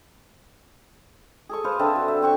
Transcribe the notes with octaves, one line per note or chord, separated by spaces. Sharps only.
G#4 A4 C#6
B4 C5 F5 A5
D3 C4 E5 A5
F#4
E5
C4 F#4 C#6